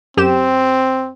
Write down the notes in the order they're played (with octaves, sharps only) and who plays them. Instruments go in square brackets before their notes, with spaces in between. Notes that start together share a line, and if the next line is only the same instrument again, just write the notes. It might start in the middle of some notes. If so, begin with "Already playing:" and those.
[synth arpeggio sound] F#2 G4 E7 [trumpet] C4